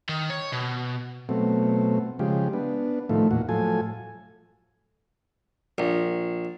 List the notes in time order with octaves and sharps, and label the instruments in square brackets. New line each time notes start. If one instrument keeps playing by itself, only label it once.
[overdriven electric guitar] D#3
C#5
B2
[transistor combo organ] B2 F#3 A3 C4
C#3 F3 G#3 G4
B3 D4
A2 D#3 F3 A3
E2 A#2 F#4
A2 F3 F#3 A4 G#5
[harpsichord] A#1